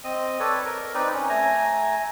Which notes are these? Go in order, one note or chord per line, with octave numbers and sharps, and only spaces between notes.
C4 D#5
A4 B4 C#5 D5
A#4
C4 D#4 B4 D5
C#4
A3 G#5 A#5